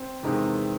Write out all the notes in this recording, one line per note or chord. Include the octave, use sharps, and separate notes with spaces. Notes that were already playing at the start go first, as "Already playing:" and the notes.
Already playing: C4
E2 C3 D#3 G#3 C4